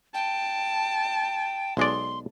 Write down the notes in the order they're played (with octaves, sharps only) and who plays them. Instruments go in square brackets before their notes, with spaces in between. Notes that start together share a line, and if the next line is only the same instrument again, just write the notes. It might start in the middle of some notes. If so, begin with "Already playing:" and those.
[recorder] G5 [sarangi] A5
[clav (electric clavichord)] B1 G#3 D5 [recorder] C6